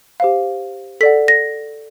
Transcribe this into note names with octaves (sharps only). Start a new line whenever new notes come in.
G4 C5 F5
A4 D5 F#5 B6
A#6